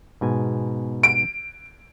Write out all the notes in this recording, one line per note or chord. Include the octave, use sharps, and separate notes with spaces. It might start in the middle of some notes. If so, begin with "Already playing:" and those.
G#2 B2 G#5
D7